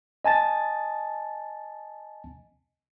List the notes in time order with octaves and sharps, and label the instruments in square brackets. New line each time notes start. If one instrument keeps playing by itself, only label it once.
[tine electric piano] D#5 G#5 A5 A6